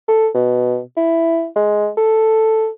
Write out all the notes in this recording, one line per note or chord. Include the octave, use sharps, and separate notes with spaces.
A4
B2
E4
G#3
A4